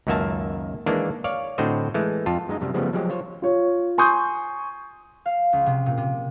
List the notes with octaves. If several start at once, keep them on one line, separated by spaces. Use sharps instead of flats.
C#2 F#2 D#3 A#3 E5 A5
D#3 E3 G#3 A#3 D4
C#5 D5 F5
A2 D3 C4 F#4 C5 D#5
E3 G#3 A3
F2 F4 A5
F#2 G#3 D#4 D#5
F#2 C3 G3
C#3 F3 G3 A3 B3
F3 F#3 G#3 G4
F4 C5 C#5
F4 C#5
G#5 C6 C#6 D#6 G6
F5
C#2
C3
A#2
C3